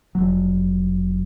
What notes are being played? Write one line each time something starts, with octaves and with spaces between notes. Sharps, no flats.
F1 F#3